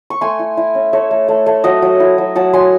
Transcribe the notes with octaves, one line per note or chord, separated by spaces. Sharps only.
C#6
A3 G#5 C6
E4
E4
C#4
A3 C#5 E5
A3
A3
A3
F#3 D#5 F#5
F#3
E4
F#3
F#3 F#5 A5
F#3 G#5 C6